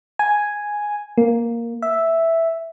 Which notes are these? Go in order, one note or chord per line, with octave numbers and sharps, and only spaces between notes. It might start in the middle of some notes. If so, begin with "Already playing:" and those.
G#5
A#3
E5